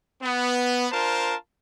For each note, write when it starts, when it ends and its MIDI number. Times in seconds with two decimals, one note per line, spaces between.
0.22 0.87 59
0.92 1.34 62
0.92 1.34 65
0.92 1.34 70
0.92 1.34 72
0.92 1.34 81